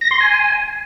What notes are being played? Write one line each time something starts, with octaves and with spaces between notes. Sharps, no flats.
A#6
C6
G#5